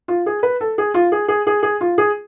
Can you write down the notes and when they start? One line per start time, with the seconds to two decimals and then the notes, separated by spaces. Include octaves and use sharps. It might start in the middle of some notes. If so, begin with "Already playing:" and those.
0.08 F4
0.26 G#4
0.43 B4
0.61 A4
0.78 G#4
0.94 F4
1.12 G#4
1.28 G#4
1.47 G#4
1.63 G#4
1.81 F4
1.98 G#4